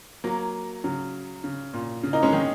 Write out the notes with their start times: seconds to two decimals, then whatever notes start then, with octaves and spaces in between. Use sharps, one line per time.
0.24 F#3 A#3
0.84 C#3 F#3
1.44 C#3
1.73 A#2
2.03 C#3
2.13 A#3 D#4
2.23 G#3 C#4
2.33 D#3 G#3